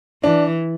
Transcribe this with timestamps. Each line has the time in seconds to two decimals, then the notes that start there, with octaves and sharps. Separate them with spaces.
0.23 E3 D4